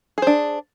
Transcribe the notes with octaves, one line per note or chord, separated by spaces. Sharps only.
D4 G#4 C5